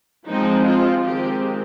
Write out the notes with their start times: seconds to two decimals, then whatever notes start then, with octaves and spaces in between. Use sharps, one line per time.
0.28 F3 G#3 C4 D#4
0.66 F4
1.04 D#3 G#3 C4 G4